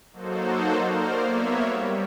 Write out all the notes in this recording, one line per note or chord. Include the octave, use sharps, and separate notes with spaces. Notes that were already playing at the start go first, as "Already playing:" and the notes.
F#3 A#3 D#4 F#4 A4 C5
A#3 C5 D5 F6
A#3 B3 C#5 E5
G3